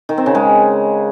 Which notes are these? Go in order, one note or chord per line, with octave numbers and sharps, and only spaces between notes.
D#3
C4
C#3
G#3